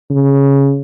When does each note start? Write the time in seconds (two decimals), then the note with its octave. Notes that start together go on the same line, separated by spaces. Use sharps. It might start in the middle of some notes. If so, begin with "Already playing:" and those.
0.10 C#3